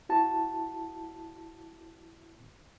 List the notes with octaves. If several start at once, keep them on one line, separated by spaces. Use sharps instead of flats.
E4 F#4 A5